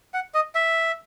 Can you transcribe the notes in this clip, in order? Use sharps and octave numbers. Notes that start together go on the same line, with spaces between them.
F#5
D#5
E5